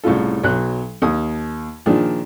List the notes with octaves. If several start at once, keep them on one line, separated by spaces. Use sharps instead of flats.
C2 A2 C#3 F4 A4
B1 F#3 F#6
D#2 D#6
A#2 D#3 F3 D4 G#4